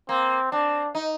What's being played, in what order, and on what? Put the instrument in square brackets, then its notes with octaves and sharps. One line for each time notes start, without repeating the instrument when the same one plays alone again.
[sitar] A#3 [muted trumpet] C4
[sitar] C4 [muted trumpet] D4
[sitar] D#4